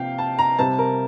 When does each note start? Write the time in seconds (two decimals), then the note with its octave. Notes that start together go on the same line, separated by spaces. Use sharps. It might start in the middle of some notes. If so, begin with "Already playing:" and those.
Already playing: C3 F3 A#3 F5 G5
0.18 A5
0.39 A#5
0.59 C3 G3 C4 A5
0.78 A#4